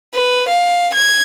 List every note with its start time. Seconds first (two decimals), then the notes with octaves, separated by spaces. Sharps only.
0.14 B4
0.48 F5
0.93 G#6